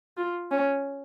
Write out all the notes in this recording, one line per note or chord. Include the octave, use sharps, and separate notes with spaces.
F4
C#4